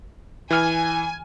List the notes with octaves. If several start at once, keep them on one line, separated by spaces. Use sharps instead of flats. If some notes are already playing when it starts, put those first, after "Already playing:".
E3 G#5 F6